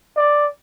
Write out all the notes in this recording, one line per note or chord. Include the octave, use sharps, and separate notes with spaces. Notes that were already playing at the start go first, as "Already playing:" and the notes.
D5